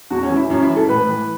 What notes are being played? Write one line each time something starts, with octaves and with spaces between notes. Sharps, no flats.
E2 F#4
C#4
E3
E4
F#2 C#4
E4
E3
A4
A2 B4
E3